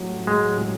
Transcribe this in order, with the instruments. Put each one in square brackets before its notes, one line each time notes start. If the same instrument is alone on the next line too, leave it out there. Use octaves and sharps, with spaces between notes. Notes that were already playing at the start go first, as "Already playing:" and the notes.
Already playing: [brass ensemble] A1 A2 F#3
[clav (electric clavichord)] G#3